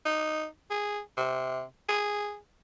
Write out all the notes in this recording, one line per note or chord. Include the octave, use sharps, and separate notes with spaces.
D#4
G#4
C3
G#4